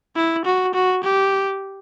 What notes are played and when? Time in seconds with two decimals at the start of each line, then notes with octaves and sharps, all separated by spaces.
0.16 E4
0.45 F#4
0.74 F#4
1.04 G4